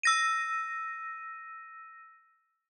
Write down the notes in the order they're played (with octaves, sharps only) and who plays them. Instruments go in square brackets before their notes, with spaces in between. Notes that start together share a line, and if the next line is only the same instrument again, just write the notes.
[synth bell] E6 A#6 D#7